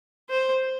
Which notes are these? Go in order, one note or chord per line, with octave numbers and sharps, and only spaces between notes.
C5